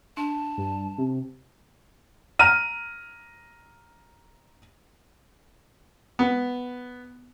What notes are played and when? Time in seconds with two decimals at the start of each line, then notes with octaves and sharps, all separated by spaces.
0.17 D4 A5
0.57 G2
0.98 C3
2.39 A#5 F6 D#7
6.19 B3